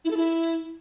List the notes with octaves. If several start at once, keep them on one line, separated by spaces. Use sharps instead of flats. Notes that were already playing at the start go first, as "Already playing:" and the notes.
E4
A4
E4